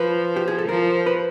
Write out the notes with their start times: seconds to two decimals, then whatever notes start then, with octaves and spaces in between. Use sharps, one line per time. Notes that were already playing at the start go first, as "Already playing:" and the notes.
Already playing: F3 B4
0.36 G4
0.48 G#4
0.59 A4
0.68 F3 A#4
1.06 B4